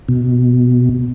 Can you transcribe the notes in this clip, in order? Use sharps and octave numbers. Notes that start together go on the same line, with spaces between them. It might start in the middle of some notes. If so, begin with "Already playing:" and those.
B2